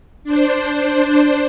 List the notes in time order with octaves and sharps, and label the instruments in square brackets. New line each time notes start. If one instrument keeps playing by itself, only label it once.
[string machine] D4 C5